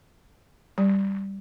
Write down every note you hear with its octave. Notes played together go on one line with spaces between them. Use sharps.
G3